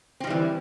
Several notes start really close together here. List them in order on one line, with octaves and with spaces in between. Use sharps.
C4 F3 G3 E3